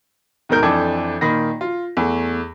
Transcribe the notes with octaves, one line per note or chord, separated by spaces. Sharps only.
D#2 G#2 B2 A#4 G6
F2 E3 D4 A4 D6 G#6
A#2 D#3 B5 A#6
F4
E2 A3